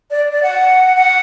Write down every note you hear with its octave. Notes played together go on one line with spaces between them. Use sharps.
D5
D5
F#5
F#5